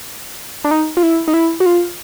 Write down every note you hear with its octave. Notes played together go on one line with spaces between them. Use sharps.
D4
D#4
F4
E4
D#4
E4
F#4
F4